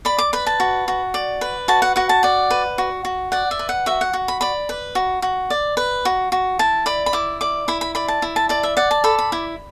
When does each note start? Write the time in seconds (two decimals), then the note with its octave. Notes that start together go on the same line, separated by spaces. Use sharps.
0.05 D5 B5
0.18 D6
0.33 B4 B5
0.46 A5
0.60 F#4
0.88 F#4
1.14 D5
1.41 B4
1.68 F#4 A5
1.82 F#5
1.96 F#4 F#5
2.09 A5
2.23 D5 F#5
2.50 B4
2.78 F#4
3.05 F#4
3.32 D5 F#5
3.51 E5
3.59 B4
3.69 F#5
3.86 F#4 E5
4.01 F#5
4.13 F#4
4.28 B5
4.41 D5 B5
4.69 B4
4.95 F#4
5.22 F#4
5.50 D5
5.77 B4
6.05 F#4
6.32 F#4
6.59 E4 A5
6.86 D5 B5
7.06 B5
7.13 E4 D6
7.41 D5 D6
7.68 E4 B5
7.81 B5
7.95 D5 B5
8.08 A5
8.22 E4
8.36 A5
8.49 D5 A5
8.63 E5
8.77 D5 F#5
8.91 A5
9.04 A4 B5
9.19 B5
9.32 E4